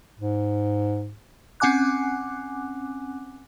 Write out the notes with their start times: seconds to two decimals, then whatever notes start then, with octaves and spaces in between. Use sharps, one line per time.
0.19 G#2
1.60 C4 C#4 F#5 G#5 D6 F#6